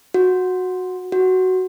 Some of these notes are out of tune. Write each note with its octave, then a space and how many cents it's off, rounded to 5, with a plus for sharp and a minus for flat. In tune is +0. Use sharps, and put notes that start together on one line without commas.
F#4 -10
F#4 +10